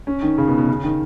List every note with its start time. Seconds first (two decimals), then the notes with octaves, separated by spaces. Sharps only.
0.07 C#4
0.22 D#3
0.38 C#3
0.48 B2
0.58 B2
0.68 C#3
0.83 D#3